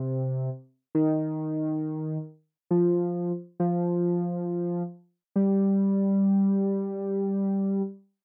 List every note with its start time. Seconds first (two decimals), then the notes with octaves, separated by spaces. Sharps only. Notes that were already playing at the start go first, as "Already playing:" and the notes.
Already playing: C3
0.95 D#3
2.71 F3
3.60 F3
5.36 G3